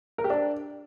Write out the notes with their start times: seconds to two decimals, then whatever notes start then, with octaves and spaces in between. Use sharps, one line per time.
0.18 A#4
0.24 G4
0.30 D4